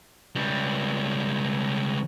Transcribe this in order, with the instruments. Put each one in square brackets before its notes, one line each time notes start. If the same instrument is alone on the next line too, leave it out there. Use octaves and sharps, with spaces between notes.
[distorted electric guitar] C#2 G3